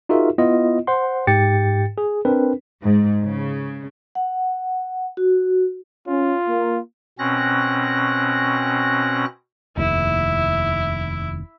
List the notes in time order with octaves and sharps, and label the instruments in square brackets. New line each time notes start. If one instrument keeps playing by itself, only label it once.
[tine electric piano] D#4 F4 F#4 G#4 A#4 E5
B3 E4 F4 D#5
C5 F#5 C6
G#2 G4 G5 A6 C#7
G#4
C4 D4 A#4 B4
[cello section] G#2
C#3
[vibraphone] F#5
F#4
[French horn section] C#4 [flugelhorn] F4
[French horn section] A#3
[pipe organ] B2 C4 C#4 F#6 A#6
[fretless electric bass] F1 D#2 [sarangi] E4